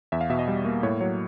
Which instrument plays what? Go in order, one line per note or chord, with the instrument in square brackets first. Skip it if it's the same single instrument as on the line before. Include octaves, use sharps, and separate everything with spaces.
[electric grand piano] E2 E5
F5
B2 E5
D#5
G3
A#3
A2 C#5
F#3 C#5